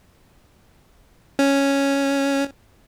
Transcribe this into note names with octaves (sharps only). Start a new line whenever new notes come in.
C#4